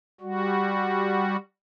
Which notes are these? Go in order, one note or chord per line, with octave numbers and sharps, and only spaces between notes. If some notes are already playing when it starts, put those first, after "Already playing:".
G3 F#4